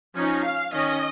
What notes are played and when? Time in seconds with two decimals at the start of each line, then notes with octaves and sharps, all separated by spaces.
0.16 F3 C#4 D#4
0.44 F5
0.72 D#3 C#4 D#5